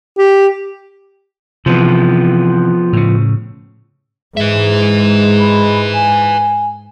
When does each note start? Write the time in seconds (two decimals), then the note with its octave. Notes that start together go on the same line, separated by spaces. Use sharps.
0.18 G4
1.66 C3 E3 F3 B3
2.93 A2 C#3
4.37 G#2 G#3 B4 E5
5.39 B5
5.94 G#5